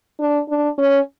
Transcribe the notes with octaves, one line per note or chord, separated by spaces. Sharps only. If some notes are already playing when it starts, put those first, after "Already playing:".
D4
D4
C#4